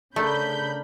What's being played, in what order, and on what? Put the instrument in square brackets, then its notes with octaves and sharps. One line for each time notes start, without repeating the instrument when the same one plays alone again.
[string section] C#3 B5 G6 [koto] A3 [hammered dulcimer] D4 A#4